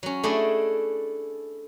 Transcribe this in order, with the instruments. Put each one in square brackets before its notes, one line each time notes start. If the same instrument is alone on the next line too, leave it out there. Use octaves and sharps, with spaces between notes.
[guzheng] F#3 C#4
A3 D4 E4 G#4 D5 D#5